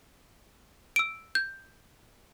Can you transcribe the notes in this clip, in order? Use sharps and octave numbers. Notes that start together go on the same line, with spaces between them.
E6 D7
G6